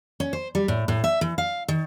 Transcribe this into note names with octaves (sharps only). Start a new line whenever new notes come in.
C#4
C5
G3
A2
A2
E5
E3
F5
D#3